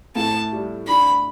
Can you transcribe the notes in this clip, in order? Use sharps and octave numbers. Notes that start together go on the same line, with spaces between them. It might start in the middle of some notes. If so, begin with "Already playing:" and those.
A2 A5
G3
D4 B5